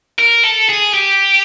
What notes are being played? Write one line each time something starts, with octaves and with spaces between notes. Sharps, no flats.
A#4
A4
G#4
G4